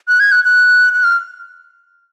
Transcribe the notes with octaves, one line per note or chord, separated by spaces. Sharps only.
F#6
G#6
F#6
F#6
F#6
F6